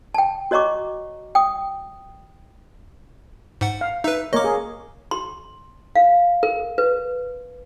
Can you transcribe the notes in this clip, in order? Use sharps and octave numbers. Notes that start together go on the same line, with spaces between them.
G5 A5
F#4 C#5 D#5 A#5 C#6 D6
G5 D#6
G#2 F#5
F5
D#4 B4 E5
A#3 A#4 C#5 D#5 D6
G#4
C6
F5
A#4
B4